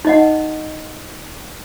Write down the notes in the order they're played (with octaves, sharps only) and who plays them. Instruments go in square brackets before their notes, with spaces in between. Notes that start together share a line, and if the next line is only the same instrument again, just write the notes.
[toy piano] D#4 D#5 F#5